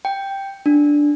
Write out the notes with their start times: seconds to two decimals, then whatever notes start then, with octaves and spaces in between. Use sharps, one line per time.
0.05 G5
0.66 D4